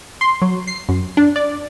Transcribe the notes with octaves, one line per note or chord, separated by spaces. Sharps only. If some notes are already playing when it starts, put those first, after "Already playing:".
C6
F#3
C7
F#2
D4
D5